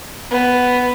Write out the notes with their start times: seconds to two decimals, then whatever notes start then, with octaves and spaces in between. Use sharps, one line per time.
0.31 B3